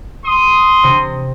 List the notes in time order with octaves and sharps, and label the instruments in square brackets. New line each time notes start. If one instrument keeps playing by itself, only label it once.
[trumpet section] C6 D#6
[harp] C3